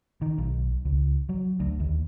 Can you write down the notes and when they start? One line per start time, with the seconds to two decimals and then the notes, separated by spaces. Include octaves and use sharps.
0.22 D#3
0.38 B1
0.85 C#2
1.29 F#3
1.60 D2
1.80 D#2